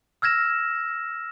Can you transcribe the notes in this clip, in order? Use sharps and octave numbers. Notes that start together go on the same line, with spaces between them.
E6 F6 G#6 A#6 E7